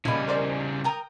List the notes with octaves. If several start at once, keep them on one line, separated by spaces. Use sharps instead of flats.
A#2 C#3 G3 D#5 G#5 B5
A#4 C5 D5
A#4 G5 A#5 D#6